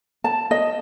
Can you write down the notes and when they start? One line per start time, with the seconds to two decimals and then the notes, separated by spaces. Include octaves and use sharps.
0.24 A5
0.51 D#5